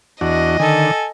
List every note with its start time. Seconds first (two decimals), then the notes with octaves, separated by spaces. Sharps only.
0.21 E2 D4 F#4 D#5
0.60 D3 D#3 A4 G#5